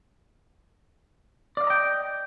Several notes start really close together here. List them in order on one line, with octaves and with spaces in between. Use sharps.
D5 F5 D#5 A#5 G5